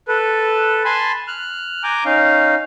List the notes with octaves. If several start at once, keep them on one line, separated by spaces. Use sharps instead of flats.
A4 B4
G#5 A5 B5 C6
F6 F#6
G#5 A#5 D6 G6
C#4 D#4 F5